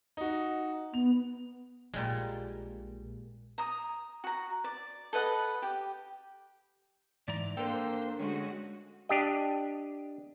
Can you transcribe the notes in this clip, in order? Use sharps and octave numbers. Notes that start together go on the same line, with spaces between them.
D#4 F#4
B3 F7
A#1 A#2 G3 G#3
A#5 D#6
F#4 A#5
D5
A4 B4 D#5 F#5
G4
G#2 E3 D5 A#5
A#3 C4 D4 A4 C5 G5
D3 G#3 A3 C#4 F#4
D4 G4 D#5